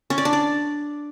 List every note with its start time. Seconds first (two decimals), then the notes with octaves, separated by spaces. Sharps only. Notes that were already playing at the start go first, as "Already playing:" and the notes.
0.10 C#4
0.18 D5
0.25 D4
0.33 D5